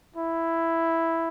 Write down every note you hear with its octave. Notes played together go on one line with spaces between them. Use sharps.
E4